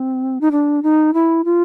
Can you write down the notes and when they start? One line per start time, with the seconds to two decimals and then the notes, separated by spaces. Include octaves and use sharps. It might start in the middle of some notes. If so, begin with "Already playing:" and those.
Already playing: C4
0.41 D#4
0.52 D4
0.83 D#4
1.14 E4
1.45 F4